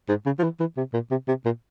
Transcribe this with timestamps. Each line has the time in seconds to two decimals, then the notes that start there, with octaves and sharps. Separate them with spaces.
0.09 G#2
0.26 C#3
0.39 F3
0.43 E3
0.60 E3
0.77 C3
0.94 A#2
1.11 C3
1.28 C3
1.45 A#2